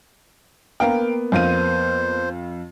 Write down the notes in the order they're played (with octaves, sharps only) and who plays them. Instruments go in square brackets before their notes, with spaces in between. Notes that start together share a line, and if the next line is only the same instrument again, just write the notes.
[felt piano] A#3 B3 [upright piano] A#4 F5 G5
[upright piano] F2 F5 D#7 [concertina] C5